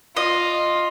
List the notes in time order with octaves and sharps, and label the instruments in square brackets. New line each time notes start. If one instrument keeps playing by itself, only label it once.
[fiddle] F4 [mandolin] D#5